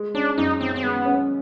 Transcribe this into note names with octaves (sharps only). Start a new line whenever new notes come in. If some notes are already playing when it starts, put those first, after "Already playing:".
Already playing: G#3
C#4 D4
F#2 D#4
D#3 C4
C4
G#3 B3
C#4